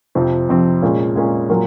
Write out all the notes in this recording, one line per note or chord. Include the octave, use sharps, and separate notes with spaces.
F2 C3 F3 C4
F2 C3 F3 C4
A#2 G#3 C#4 F4 G#4
A#2 G#3 C#4 F4 G#4
A#2 F#3 A#3